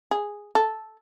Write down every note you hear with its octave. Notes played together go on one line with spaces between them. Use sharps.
G#4
A4